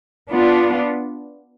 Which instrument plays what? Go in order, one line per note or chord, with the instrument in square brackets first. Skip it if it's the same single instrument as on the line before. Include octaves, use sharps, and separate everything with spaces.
[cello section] B3 D4 F4